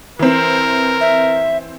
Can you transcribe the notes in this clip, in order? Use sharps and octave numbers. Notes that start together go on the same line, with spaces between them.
E3 C4 A#4
E5